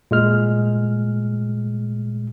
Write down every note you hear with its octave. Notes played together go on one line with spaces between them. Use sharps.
A#2 G#3 F6